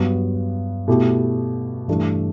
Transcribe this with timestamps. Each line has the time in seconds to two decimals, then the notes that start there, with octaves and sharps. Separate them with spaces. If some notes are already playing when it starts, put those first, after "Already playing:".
Already playing: G2 F#3 B3 F#4
0.88 B2 A3 E4 G4
1.88 G2 E3 A3 D4 G4